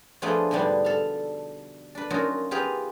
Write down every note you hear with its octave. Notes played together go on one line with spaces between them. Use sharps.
F3 A3 B3 D4 F4 G#4
G#2 B2 D3 G3 B3 D4
A4 F5
D4 B4
F#2 A#3 D#4 F4 F#4
B3 F4 G4 G#4 F5